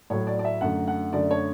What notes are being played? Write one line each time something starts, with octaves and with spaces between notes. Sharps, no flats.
A2 F#3 A3 C#5
D5
D5
E5
F#2 D3 A3 F#5
F#5
F#2 D3 A3 D5
C#5